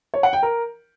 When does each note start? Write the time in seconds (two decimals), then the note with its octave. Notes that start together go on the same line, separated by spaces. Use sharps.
0.14 C#5
0.23 F#5
0.33 G5
0.43 A#4